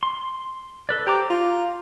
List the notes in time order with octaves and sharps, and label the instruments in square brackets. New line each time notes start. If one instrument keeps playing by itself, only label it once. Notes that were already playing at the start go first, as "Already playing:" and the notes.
[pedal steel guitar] C6
A4 B4 D5
[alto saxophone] G4 [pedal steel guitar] C5 A#5 D6
[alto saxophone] F4 [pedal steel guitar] A#5